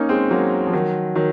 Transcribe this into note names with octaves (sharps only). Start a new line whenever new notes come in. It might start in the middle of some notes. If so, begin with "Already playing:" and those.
Already playing: A#3 C#4 D#4
G#3 C4
F#3 A#3
F3
D#3 F#3
D#3 F#3